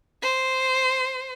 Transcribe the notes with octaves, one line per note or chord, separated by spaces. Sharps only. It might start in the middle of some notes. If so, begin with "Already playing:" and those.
C5